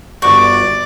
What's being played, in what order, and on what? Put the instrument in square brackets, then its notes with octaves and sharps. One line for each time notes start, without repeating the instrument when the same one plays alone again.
[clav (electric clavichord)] G1 F#4 C5 [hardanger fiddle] D5 [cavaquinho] C#6